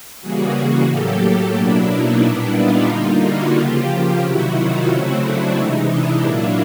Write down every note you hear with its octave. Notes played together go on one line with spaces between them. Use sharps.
C#3 E3 G3 A#3 F#4 G#4
A2 F#3 A#3 G4 A4
B2 F#3 A#3 D4 E4
D#4
A#2 G3 B3 D4 E4
D#4 F4
D3 G3 A#3
E4 F#4
C#3 F3 A#3 F4 G4
C3 D#3 F#3 E4 F#4
D#4 F4
C#3 F#3 A3 C4 E4 F#4
D4 E4
C3 E3 G#3 D#4
D4 E4
A#2 F#3 A#3 D4 E4